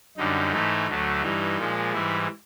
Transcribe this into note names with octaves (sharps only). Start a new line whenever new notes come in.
F#2 D3 G3 D#4
G#2 E3 A3
D2 D3 F#3 A3
G2 E3 G3 D#4
A#2 F3 G#3
G#2 E3 G3 E4